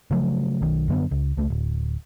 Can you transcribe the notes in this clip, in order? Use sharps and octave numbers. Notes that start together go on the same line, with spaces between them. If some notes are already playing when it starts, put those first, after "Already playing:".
C#3 F3 F#3 A3
B1 D#3
F#2 D3 A3 B3
C#2
C#2 A3
D1